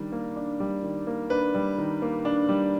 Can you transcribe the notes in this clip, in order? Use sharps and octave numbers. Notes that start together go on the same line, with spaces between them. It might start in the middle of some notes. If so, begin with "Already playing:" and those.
Already playing: D#3 G3 D4
A#3
D4
G3
D#3
A#3
D4 B4
G3
D#3
A#3
D4
G3